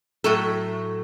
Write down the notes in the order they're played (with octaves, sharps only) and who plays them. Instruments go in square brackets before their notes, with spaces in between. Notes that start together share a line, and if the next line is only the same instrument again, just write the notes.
[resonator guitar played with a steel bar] A2 F#3 A3 A4